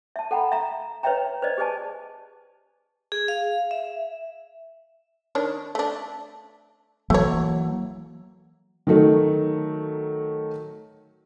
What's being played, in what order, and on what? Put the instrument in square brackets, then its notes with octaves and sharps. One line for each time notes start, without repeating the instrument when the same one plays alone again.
[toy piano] E5 A5
A4 F#5 G5 A#5 B5
E5 F5 A#5
B4 C#5 D#5 E5 G5 A#5
B4 C5 D5 D#5
G4 G#4 B4 D#5 G#5 A5
[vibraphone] G#4
F5
E5
[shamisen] D#3 D4 C#5
A3 D4
[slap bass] E3 F#3 A#3 [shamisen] A3 C#5
[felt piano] D#3 F#3 A3 D#4